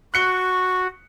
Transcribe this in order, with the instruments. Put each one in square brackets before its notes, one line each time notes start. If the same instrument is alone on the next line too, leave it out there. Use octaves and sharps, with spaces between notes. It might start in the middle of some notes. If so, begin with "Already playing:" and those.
[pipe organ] F#4 [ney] C#6 [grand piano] F#6 C#7 G7